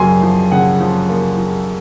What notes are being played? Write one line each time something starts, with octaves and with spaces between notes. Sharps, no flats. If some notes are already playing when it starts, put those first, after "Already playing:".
Already playing: F#2 C#3 A#3 G#5 C6
F3
C#3 F#5
F3
A#3
F3